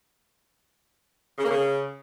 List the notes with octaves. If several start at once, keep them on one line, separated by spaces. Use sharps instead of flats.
C#3
A#3
C#3